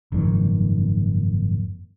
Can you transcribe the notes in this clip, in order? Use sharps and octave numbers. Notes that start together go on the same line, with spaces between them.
F#1 F2 G#2 D#3